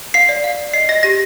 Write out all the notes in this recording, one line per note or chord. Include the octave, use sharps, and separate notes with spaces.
F5 C7
D5
F5
D5
D#5 C7
D#5 A#6
G4 A#6